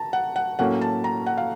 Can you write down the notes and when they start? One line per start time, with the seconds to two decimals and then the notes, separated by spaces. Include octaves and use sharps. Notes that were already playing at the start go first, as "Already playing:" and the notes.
Already playing: A5 A#5
0.13 F#5
0.36 F#5
0.59 A2 F#3 A#3 C#4 F#5
0.81 A5
1.04 A#5
1.27 F#5
1.38 F5